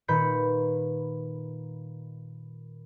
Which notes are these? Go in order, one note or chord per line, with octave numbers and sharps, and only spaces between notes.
A#2 D#3 B4 B5 G6 C#7